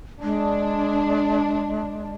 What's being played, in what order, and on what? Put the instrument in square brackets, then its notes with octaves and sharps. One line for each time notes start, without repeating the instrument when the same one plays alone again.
[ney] G#3 [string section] D4